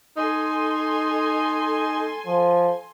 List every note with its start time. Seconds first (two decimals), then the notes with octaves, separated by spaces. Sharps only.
0.17 D#4 A4 G#5 C6
2.27 F3